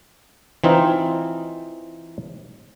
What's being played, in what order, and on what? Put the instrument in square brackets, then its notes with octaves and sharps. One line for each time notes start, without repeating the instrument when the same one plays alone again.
[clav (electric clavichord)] E3 C4 D#4 F4